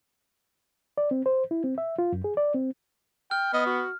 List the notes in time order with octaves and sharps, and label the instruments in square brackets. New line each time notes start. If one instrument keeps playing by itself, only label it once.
[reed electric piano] D5
C4
C5
E4
C4
E5
F4
F#2
G#4
D5
C4
[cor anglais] G5 [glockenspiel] F6
[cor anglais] B3 [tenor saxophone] D#5
[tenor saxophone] F#4